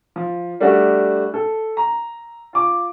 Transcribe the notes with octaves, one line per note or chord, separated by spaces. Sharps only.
F3
G3 A3 D4 F#4
A4
A#5
F4 D6